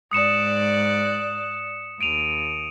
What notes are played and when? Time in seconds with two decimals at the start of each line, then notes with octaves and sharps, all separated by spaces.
0.11 G#2 D5 D#6 F#6 C#7 E7
2.01 D#2 D7 D#7 F7